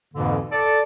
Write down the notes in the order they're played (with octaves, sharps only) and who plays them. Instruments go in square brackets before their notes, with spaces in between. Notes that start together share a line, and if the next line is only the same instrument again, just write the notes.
[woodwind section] F2 G#2 B2 D3 E3 A#3
A4 D5